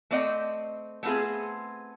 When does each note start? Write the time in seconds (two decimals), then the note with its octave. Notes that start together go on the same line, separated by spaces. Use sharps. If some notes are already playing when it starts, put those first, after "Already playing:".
0.11 A3 C4 D5 D#5 F5 G5
1.03 A3 B3 C4 F4 G#4